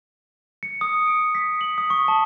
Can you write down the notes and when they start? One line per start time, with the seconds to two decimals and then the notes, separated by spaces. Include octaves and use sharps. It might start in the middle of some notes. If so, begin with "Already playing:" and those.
0.63 C#7
0.81 D#6
1.07 D7
1.35 B6
1.61 F#7
1.78 D#6
1.90 C#6
2.08 A5